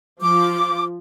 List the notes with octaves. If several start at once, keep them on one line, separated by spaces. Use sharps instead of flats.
F3 D6